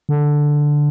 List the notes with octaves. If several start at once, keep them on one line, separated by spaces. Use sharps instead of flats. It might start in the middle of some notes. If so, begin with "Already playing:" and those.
D3